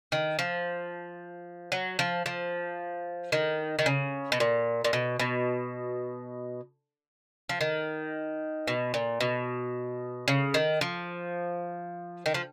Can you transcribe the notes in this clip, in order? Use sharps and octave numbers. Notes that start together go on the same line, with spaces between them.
D#3
F3
F#3
F3
F3
D#3
D#3
C#3
B2
A#2
A#2
B2
B2
F3
D#3
B2
A#2
B2
C#3
D#3
F3
D#3
F3